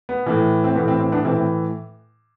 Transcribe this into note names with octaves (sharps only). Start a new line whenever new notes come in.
B3
A2 E3
C4
A2 E3 B3
C4
C4
B3 D4
A2 E3 C4 E4
C4